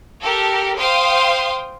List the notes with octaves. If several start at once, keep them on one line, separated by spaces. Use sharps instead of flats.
G4 A4 A#4
C5 F5 G5 C6 D#6